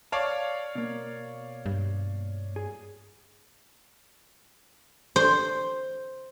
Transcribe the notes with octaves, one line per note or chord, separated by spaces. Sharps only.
C#5 D5 F5 A5
B2 A#3
G2
G#4
C5